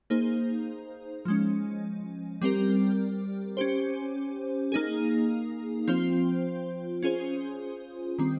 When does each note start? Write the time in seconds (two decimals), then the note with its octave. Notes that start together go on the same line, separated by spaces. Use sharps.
0.10 A#3 D#4 G#4 C5
1.25 F3 G#3 C#4
2.42 G3 C4 G4 A#4
3.57 C#4 G4 C5
4.72 A#3 D#4 G#4
5.88 F3 C4 F4 C5
7.03 C#4 F4 G#4 C5
8.18 D#3 G3 C4